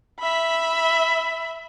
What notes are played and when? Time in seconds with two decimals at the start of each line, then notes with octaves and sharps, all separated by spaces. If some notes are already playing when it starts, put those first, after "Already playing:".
0.20 E5 B5